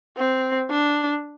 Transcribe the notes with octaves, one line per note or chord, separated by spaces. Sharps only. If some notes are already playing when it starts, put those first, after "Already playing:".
C4
D4